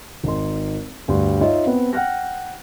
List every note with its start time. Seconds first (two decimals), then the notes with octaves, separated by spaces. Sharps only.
0.24 G#1 D#4 C6
1.08 D2 G2 G3 C6
1.41 D#4 F4 C#5 D#5 E5
1.65 B3 C4
1.93 F#5 G5 F6 F#6 A#6